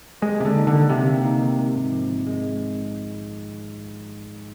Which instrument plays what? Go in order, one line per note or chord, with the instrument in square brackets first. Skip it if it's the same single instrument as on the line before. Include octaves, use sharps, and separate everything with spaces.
[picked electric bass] G#3 [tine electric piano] G4
[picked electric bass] C3 [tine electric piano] A#3
[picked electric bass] D3
[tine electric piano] D#4
[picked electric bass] D3
[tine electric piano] D#3
[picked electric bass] C3 [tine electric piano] G4
[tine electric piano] A#3
D#4
D#3
G#3
G#2
F3
A#1
G#3